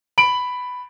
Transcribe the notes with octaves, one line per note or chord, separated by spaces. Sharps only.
B5 D7 F#7